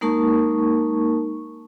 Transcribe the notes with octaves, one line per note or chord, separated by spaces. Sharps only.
G#3 A#3 D#4 A#4 A5 C#6